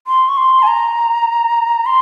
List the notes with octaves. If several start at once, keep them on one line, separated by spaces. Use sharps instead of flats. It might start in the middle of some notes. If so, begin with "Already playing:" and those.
C6
C#6
C6
G#5
A#5
C6